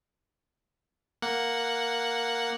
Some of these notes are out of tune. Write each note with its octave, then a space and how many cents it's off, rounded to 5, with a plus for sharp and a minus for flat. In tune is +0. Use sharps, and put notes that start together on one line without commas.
A#3 +0 F#5 +0